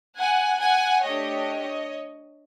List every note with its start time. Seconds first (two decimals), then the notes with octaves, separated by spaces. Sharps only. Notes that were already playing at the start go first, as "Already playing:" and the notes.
0.18 F#5 G#5
0.61 F#5 G#5
1.04 A3 D4 G4 C#5 D#5